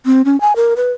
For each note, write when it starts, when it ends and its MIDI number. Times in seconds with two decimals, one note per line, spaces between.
0.06 0.22 60
0.25 0.39 61
0.41 0.53 80
0.56 0.74 70
0.77 0.91 71